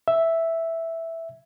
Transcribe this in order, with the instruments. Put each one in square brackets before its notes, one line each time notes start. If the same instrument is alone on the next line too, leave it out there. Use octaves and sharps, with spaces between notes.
[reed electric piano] E5